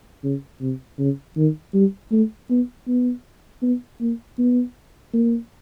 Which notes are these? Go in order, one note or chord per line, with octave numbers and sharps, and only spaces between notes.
C#3
C3
C#3
D#3
G3
A3
B3
B3
B3
A#3
B3
A#3